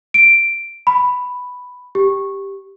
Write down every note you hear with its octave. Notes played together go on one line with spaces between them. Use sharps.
D7
B5
G4